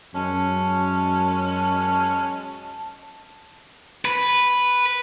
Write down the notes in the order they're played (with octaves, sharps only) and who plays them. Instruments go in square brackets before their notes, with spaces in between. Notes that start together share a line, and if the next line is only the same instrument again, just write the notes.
[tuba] F#2 [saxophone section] G#3 C#4 [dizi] A5
[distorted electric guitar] B4